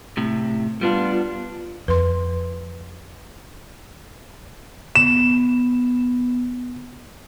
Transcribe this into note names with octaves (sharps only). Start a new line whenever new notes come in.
A2 C3
G3 B3 D4 F4
F2 B4 C6
B3 E7